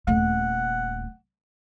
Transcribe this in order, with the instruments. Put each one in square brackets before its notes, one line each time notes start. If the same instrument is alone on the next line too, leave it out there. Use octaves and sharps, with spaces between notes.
[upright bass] D#1 A3 [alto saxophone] F#5